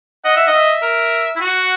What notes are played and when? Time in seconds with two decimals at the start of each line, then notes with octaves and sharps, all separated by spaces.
0.24 D#5 F#5
0.37 E5
0.47 D#5
0.54 E5
0.83 A#4
1.36 E4
1.41 F#4 F#5